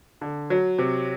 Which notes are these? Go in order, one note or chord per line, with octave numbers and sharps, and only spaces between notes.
D3
F#3
C3